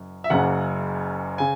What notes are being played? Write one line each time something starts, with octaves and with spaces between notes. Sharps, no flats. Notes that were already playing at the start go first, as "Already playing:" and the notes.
Already playing: F#1 F#2
E5
F#1 F#2 C#3 F#5
C#3 G#5